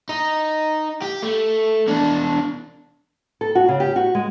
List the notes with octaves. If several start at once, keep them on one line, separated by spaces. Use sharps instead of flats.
D#4
G4
A3
E2 D4
A4
F#4
C#3
G4
F#4
G#3